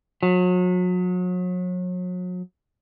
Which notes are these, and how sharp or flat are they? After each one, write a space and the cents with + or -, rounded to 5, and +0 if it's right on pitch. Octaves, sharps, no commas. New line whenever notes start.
F#3 -35